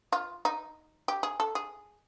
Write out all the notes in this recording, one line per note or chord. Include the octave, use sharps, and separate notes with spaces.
F4
D#4
G4
G#4
A4
G#4